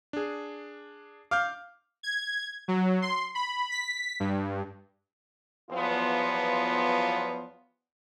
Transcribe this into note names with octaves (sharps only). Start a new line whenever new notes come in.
D4 G#4
F5 D6 F6 G6
G#6
F#3
C6
B5
B6
G2
E2 F3 F#3 B3 F4